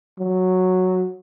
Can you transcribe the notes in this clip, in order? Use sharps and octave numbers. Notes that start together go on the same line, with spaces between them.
F#3